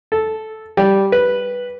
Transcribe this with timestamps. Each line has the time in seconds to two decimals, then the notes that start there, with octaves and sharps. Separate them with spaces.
0.12 A4
0.77 G3
1.12 B4